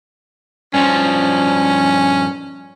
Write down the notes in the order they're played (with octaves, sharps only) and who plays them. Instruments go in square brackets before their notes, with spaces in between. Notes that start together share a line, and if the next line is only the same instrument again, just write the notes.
[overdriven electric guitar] G2 F3 [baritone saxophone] C#4